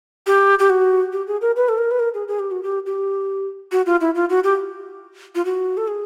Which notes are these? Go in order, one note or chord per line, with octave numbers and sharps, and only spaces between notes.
G4
G4
F#4
G4
G#4
A#4
B4
A4
A#4
B4
A#4
G#4
G#4
G4
F#4
G4
G4
F#4
F4
E4
F4
F#4
G4
F4
F#4
A4
G#4